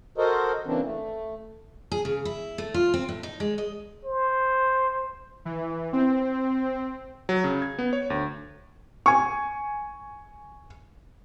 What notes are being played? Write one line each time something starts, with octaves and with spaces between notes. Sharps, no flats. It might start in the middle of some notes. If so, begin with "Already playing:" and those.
F#4 A4 A#4 C5 D#5
C#3 E3 A#3 C4 D4
A3
G#4
C#3
E4
A3
F4
C4
A2
D#4
G#3
D#5
C5
E3
C4
F#3
C#3
G#6
B3
C#5
D2
G#5 C#6